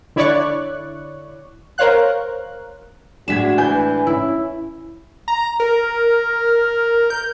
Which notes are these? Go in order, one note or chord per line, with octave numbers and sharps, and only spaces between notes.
D3 E4 C#5 D5 C#6 F#6
A#4 C5 C#5 F5 F#6
A2 G#3 D4 F#4 G#6 B6 E7
E3 G#5 G6
C#4 E4
A#5
A#4
G6